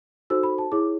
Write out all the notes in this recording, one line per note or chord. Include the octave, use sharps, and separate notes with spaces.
D#4 F#4 A4 C5 E6
B5
A5
E4 G#4 C#5 D6